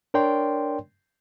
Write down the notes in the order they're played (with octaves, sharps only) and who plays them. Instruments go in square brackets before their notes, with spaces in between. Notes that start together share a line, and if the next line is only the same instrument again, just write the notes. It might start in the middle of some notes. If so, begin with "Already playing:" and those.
[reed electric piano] D4 A#4 C#5 D5 G5 C6